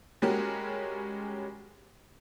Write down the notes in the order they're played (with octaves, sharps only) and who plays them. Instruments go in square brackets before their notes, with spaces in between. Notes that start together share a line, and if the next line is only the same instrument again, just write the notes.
[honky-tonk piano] G3 G#3 C#4 F#4 G4 A#4